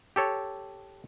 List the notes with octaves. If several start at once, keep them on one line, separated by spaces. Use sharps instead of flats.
G4 A4 C#5